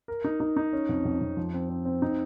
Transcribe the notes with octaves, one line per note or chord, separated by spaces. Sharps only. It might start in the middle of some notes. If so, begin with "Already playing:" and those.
A#4
D#4
D#4
D#4
C#4
F2
F2
F2
F3
C4
C4
C4
D#4